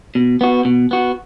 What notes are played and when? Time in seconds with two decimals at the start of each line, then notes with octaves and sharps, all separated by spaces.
0.15 B2
0.41 B3 F#4
0.65 B2
0.91 B3 F#4